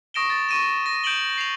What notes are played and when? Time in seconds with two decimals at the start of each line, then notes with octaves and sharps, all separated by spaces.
0.14 C#6 D#6 A#6 D7 E7 G7
0.30 A6
0.49 C#6 D#7 E7
0.86 A#6
1.04 G6 D7 E7 F#7 G7
1.38 C7 F7